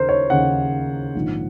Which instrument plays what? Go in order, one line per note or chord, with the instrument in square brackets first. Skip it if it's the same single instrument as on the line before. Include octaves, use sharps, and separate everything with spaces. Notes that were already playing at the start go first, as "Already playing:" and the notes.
Already playing: [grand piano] D#2 C#3 A#4 C5
C#5
D#2 C#3 F#5
A#1 G#2 D#3